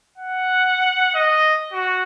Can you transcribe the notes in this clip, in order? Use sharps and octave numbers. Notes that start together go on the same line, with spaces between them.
F#5
D#5
F#4